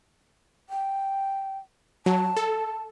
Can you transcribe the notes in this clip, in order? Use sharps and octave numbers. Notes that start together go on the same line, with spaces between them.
G5
F#3 A5
A4